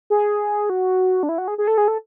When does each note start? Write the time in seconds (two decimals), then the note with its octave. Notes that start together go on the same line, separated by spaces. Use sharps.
0.10 G#4
0.70 F#4
1.23 D4
1.29 E4
1.38 F#4
1.48 G#4
1.58 G#4
1.67 A4
1.78 G#4
1.88 A4